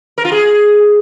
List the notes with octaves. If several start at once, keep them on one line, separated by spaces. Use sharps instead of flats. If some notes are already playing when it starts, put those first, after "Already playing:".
A#4
F4
G#4